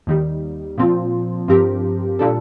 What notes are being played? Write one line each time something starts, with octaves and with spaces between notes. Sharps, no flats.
D#2 D#3 G3
A#2 F3 C4 F4
G2 F3 C4 G4 A#4
A#2 G3 D4 A4